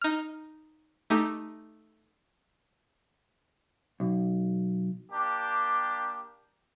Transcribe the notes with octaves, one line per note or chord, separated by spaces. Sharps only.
D#4 F6
A3 D#4 G4
B1
A#3 D4 G4